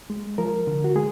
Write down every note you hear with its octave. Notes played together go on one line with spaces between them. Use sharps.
G#3
F3 A#4
D3
F#4
G#3 G#4